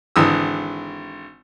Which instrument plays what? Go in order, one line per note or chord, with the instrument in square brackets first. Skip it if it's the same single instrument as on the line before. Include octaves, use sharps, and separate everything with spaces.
[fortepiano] G#1 D3 E3 D#6 E6